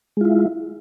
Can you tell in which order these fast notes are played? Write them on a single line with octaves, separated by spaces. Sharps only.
G#3 F4 E4